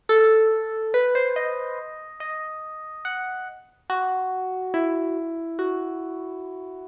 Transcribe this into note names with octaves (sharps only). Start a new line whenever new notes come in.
A4
B4
C5
D#5
D#5
F#5
F#4
E4
F#4